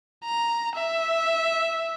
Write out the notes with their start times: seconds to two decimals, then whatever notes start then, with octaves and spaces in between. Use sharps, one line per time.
0.24 A#5
0.75 E5